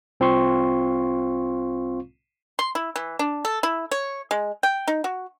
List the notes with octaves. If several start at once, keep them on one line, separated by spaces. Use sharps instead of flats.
C2 C4 F4 F5 C6 C#6
C6
E4
E3
D4
A4
E4
C#5
G#3
G5
D#4
F#4